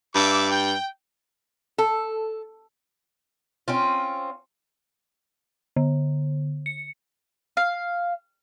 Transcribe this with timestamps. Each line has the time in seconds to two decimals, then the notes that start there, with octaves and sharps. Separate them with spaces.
0.15 G2 E5 D6
0.51 G5
1.78 A4
3.68 C4 C#4 F4
5.76 D3
6.66 C#7
7.57 F5